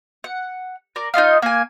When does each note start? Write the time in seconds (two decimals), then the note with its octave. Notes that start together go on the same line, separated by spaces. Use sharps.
0.24 F#5
0.96 A#4 D5
1.14 D#4 F4 D#5 F5
1.42 A#3 G#5